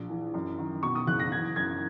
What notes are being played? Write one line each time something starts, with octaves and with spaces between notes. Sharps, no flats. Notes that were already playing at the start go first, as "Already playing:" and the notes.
Already playing: A#1
E3
F#2
D#3
B2 C#6
D#6
F#1 F#6
A#6
E3 G#6
F#2 G#6